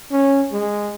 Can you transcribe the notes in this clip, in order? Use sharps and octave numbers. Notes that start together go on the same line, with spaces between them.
C#4
G#3